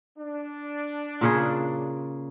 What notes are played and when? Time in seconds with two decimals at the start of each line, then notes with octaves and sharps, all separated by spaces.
0.18 D4
1.21 A#2 C#3 G#4